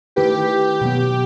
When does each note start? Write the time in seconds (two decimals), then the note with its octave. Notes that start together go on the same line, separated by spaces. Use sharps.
0.16 D#3 A3 E4 G4 B4
0.81 B2 F#3 B3